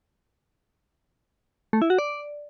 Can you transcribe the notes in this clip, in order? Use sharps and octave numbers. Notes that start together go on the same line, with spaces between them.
A3
E4
F#4
D5